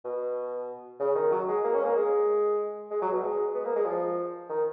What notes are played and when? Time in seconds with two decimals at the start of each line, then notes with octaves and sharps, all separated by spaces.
0.05 B2
1.00 C#3
1.15 D#3
1.31 F#3
1.48 G#3
1.64 A#3
1.74 C#4
1.84 A#3
1.96 G#3
2.91 G#3
3.02 F#3
3.12 B2
3.23 G#3
3.54 B3
3.65 A#3
3.76 G#3
3.85 F3
4.49 D#3